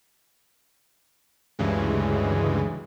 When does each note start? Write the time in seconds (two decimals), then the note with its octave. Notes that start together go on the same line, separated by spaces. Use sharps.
1.59 D2 G2 C#3 E3 G#3